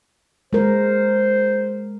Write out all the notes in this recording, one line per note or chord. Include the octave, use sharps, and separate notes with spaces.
G#3 A#4 C5